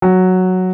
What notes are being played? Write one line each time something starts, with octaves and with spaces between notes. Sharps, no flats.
F#3